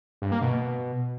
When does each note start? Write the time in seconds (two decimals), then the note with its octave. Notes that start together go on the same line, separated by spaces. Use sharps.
0.22 G2
0.32 A#3
0.42 B2
0.52 B2